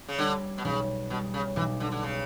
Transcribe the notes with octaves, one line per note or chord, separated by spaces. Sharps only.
C#3
D3 G3
B2
B1 C#3
B2 G3
C#3
B1 E3
D3
D3
C#3